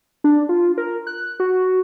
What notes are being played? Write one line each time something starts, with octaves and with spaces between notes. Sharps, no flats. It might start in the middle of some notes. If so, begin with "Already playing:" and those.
D4
F4
A#4
F#6
F#4